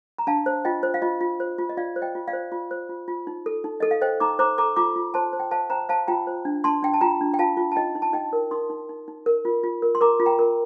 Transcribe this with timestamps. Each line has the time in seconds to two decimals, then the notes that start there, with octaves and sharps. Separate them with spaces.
0.18 A#5
0.27 D4 F5 A5
0.46 C5
0.65 F4 D#5 G5
0.83 C5
0.94 F5
1.02 F4 D#5
1.21 F4
1.40 C5
1.58 F4
1.69 D#5
1.77 F4 D5 F5
1.96 C5
2.02 D#5 G5
2.15 F4
2.28 D5 F5
2.33 C5
2.52 F4
2.71 C5
2.89 F4
3.08 F4
3.27 D#4
3.46 A4
3.64 D#4
3.80 A4 D#5
3.91 F5
4.01 C5 D#5 G5
4.20 D#4 A#5 D6
4.39 C5 A#5 D6
4.58 A4 A#5 D6
4.76 F4 A#5 D6
4.96 F4
5.14 C5 A5 C6
5.33 C5
5.40 G5
5.51 C5 F5 A5
5.70 C5 G5 A#5
5.89 C5 F5 A5
6.07 F4 G5 A#5
6.27 C5
6.45 D4
6.64 D4 A5 C6
6.83 D4 G5
6.93 A5
7.01 F4 G5 A#5
7.21 D4
7.34 G5
7.39 F4 F5 A5
7.57 F4
7.71 A5
7.76 D#4 D#5 G5
7.95 D#4
8.02 A5
8.13 D#4 D#5 G5
8.33 A#4
8.51 D#4 C6 D#6
8.70 D#4
8.89 D#4
9.08 D#4
9.26 A#4
9.45 F4
9.63 F4
9.82 A#4
9.95 C6
10.01 A#4 A#5 D6
10.20 F4
10.25 G5 A#5
10.39 A#4